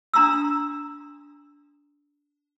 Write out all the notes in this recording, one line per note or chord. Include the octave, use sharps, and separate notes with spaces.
D4 A#5 C6 D#6 E6